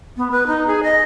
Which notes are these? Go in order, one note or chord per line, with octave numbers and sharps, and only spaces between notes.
B3
B4
D#4
G#4
D#5